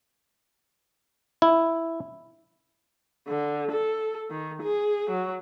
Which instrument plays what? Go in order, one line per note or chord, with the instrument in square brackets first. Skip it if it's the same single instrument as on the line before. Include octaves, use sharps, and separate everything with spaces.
[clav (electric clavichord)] E4
[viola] D3
A4
D#3
G#4
F#3